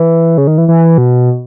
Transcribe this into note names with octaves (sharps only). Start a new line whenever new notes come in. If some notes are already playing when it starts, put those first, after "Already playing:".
Already playing: E3
C#3
D#3
E3
E3
B2